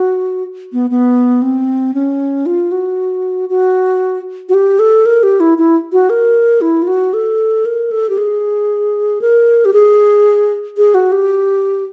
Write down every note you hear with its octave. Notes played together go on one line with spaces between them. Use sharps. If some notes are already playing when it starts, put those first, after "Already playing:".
Already playing: F#4
B3
B3
C4
C#4
F4
F#4
F#4
F#4
G4
A4
A#4
G4
E4
E4
F#4
A#4
E4
F4
F#4
A4
A#4
A4
G4
G#4
A#4
G4
G#4
G#4
F#4
G4